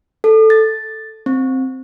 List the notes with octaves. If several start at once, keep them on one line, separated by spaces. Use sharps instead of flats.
A4
A6
C4